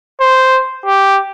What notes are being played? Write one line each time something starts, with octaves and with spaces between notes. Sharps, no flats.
C5
G4